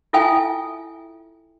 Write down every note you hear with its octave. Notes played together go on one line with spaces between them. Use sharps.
E4 F4 A4 E5 G5 G#5